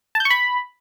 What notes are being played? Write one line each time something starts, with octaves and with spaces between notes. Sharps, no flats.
A5
G6
C#6
B5